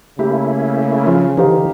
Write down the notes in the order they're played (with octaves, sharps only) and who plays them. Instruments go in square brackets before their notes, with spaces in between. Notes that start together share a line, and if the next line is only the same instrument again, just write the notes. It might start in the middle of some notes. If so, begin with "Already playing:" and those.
[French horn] C#3 [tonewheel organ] A3 A#3 E4 [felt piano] G4
[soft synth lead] F3 [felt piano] C#4 F4
[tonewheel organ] D3 E3 [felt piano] D#4 C5 F5 [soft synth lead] G4